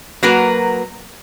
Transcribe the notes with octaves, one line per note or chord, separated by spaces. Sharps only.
F#3 A#3 F#4 A#4 B4